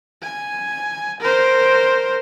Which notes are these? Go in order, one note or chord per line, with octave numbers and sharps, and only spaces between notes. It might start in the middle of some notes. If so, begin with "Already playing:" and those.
G#5
A#4 C5